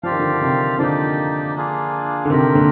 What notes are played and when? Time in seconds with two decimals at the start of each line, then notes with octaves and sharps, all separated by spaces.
0.03 F3 C4 G4 D5 F5
0.12 D#3
0.19 D3 F3
0.33 D3
0.41 C3 D#3
0.78 D3 F3 A#3 D#4 G4 D5
1.55 A#3 D4 F4 G#4
2.25 D3
2.30 C3 D#3 C4 G4 A#4
2.55 A#2 D3